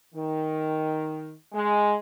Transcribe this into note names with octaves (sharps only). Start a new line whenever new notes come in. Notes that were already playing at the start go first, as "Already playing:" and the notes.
D#3
G#3